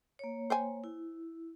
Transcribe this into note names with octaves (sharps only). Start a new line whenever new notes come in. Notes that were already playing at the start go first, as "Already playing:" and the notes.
A#3 C#5
C5 G5 G#5
E4